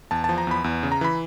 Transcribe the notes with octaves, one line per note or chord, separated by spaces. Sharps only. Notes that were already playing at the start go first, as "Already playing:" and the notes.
E2 A5
A5
F3
A#5
E2 B5
E2
C#3
A#5
E3 B5